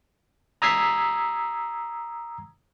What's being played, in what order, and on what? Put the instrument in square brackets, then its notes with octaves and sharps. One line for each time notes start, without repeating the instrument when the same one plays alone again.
[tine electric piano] A#5 D#6 E6 G#6 B6 C7